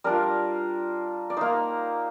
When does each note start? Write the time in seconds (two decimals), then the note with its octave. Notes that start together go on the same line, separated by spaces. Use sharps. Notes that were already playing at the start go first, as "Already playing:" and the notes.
0.04 G3 D4 F4 A#4
1.30 D5
1.37 A#3 D#4 C5